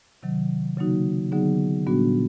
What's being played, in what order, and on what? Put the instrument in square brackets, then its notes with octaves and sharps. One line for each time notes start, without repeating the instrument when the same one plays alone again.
[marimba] C3 D#3 F#3
C#3 F#3 A#3 D#4 F#4
D3 F#3 B3 D#4 G#4
A#2 G3 B3 D4 F#4